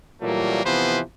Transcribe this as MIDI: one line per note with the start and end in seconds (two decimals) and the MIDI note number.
0.22 0.62 46
0.22 0.62 52
0.22 0.62 54
0.22 0.62 55
0.22 0.62 57
0.22 0.62 58
0.65 1.00 48
0.65 1.00 52
0.65 1.00 53
0.65 1.00 59
0.65 1.00 71
0.65 1.00 72